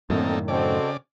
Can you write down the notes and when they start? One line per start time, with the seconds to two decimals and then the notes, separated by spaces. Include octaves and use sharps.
0.10 F#2 A2 D3 D#3 A#3 C4 D#4 A4
0.48 C#3 C4 F#4 A4 D5 D#5